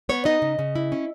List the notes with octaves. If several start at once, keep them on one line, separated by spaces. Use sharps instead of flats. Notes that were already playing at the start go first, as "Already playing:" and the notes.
B3 C#5
D#4 D#5
C#3
C#3
E4
C#4